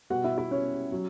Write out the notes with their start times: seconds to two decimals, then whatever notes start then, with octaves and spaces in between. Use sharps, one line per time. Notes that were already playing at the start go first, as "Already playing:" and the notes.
0.10 B2 G3 F#4 F#5
0.24 E4 E5
0.37 E4 E5
0.51 C#4 C#5
0.92 F#3